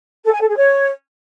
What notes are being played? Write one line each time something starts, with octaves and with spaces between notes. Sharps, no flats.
A4
G#5
A4
G#4
C#5